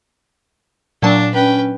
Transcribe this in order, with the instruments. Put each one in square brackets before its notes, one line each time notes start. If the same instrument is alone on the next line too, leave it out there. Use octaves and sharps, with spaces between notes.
[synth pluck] A#2 F#3 A5 [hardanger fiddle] D4
[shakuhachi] C#4 [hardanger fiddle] B4 G5